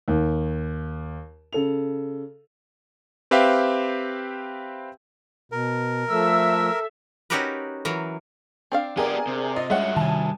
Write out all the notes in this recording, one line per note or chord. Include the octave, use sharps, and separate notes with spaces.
D#2
C#3 A4 F7
C4 G4 B4 E5 F5 G5
B2 A#4
F3 A3 A4 E5 E6
C#4 D#4 F#4 G4 A#4 B4
E3 F#3 A#4
C4 D4 F5
B3 G4 G#4 A#4 D5
C3
F4 D#5
G2 G#3 C#4 E5 F#5
C3 D#3 G#5 A5